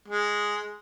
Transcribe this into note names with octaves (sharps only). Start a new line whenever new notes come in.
G#3